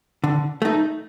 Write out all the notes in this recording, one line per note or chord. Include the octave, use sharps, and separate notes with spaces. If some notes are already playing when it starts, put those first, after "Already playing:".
D3
A3 D#4